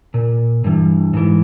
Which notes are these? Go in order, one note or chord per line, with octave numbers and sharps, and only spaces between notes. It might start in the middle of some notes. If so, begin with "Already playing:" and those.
A#2
G2 E3
G#2 E3